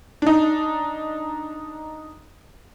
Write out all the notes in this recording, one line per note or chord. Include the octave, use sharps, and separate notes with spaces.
D4 D#4